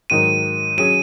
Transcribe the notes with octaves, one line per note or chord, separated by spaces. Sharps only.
G#2 D#3 F#3 D#4 D#7
F#3 C#4 G#4 D#7